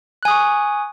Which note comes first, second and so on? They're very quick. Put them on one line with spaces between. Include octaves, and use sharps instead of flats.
F#6 G#5 D#6 C#6